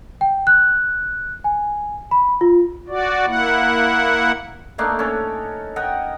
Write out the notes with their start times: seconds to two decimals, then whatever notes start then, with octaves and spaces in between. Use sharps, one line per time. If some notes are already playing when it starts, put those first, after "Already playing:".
0.21 G5
0.47 F#6
1.44 G#5
2.11 B5
2.41 F4
2.88 F#4 D5
3.26 A#3 E4 F#5
4.78 A3 A#3 D4 D#4
4.99 C#4 A4 A#4
5.76 A#4 D#5 F#5 G5